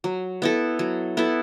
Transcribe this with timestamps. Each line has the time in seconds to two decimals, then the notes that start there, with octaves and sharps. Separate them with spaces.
0.04 F#3
0.42 B3 E4 A4
0.79 F#3
1.17 B3 E4 A4